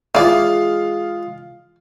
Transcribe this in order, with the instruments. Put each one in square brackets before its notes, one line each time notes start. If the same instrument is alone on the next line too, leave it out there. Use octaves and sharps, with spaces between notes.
[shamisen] E3 D5 [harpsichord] G#3 F4 [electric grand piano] F5